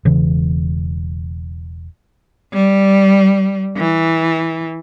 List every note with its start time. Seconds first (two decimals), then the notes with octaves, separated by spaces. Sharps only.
0.05 E1 C#3 E3
2.53 G3
3.77 E3